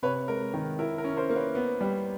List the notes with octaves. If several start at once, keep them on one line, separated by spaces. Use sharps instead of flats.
C3 B4 C#5
G#3 A#4
D#3
E4 A#4
A#4
C#4
A#4 C5
A#3
B4 C#5
B3
G3